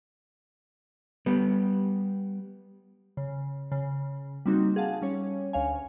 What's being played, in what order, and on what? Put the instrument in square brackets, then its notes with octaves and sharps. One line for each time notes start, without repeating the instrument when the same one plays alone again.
[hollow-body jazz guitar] G3 B3
[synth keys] C#3
C#3
G3 A#3 C4 D#4 F#4
G#4 F5 F#5 A5
G3 C#4 C#5
D2 C#5 F5 G#5